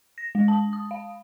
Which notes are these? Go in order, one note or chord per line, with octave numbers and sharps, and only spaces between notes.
A#6
G#3
A5
D#6
F5